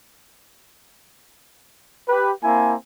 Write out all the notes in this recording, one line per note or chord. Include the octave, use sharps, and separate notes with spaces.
G4 B4
A#3 C4 E4 G#5